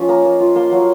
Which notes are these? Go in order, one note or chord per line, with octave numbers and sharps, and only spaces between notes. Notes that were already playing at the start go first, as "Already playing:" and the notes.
Already playing: F3 C#4 D#4 F4 G#5
A#3 A#5
A#3
F4
A#3 C6
F#3